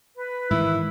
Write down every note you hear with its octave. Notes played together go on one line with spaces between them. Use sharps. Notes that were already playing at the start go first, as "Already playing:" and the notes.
B4
G#2 D#3 E3 E4